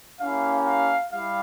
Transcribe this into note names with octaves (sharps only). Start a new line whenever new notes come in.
A#3 C#4 E4 G4 F5
F5
G3 E4 G4 F5